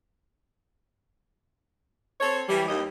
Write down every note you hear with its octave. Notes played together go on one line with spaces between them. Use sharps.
C4 A4 C#5
E3 G3
D#2 D#5